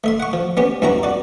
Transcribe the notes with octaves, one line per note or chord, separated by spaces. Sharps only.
A3 E5 C6
F#5 C#6
F3
B3 C#4 G4
G2 C#4 E4 F#4 A#5
F#4 D5